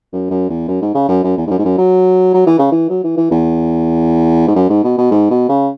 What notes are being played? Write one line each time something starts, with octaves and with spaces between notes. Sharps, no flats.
F#2
F#2
E2
F#2
G#2
C#3
F#2
F#2
E2
G#2
F#2
G#2
F#2
F#3
F#3
E3
C#3
E3
F#3
E3
E3
E2
G#2
F#2
G#2
B2
B2
G#2
B2
C#3